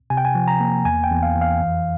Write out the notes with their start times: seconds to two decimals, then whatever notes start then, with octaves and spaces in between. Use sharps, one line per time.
0.10 C3 G#5
0.17 G5
0.25 G#5
0.35 F3
0.48 A#5
0.60 A#3
0.85 E2 G#5
1.04 G5
1.10 E2
1.23 F5
1.35 E3
1.41 F5
1.60 F2